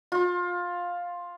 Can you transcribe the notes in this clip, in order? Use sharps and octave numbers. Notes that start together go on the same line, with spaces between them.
F4